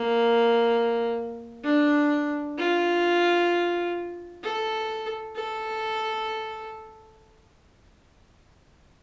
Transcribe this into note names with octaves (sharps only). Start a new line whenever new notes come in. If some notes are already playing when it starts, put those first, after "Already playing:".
Already playing: A#3
D4
F4
A4
A4